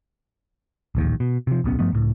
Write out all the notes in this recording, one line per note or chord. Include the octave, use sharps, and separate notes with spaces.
D1 A#1 D#2
B2
C3 F3
D1 B1 B3 C#4
G2 F3 A3 B3
C#2 A2